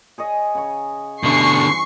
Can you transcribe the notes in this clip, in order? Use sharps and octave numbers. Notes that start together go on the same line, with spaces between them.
G#4 C#5 D#5
C#3 C#5
G2 B2 D3 E3 C#4 C#6 C7